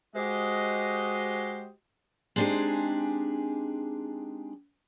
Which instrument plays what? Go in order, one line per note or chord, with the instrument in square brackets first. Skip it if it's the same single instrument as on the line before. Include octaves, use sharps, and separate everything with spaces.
[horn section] G#3 F#4 G4 C5 D#5
[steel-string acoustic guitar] G#3 C4 D4 D#4 G4 G#4